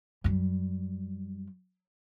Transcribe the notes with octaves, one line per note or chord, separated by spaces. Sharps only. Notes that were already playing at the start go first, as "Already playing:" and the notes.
F#2 G3